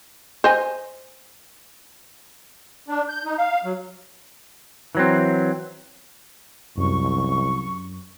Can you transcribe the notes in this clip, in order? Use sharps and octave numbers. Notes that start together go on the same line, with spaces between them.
C5 D#5 G#5
D4
G6
D#4
F5
F#3
E3 F#3 C4
C2 F#2 C#6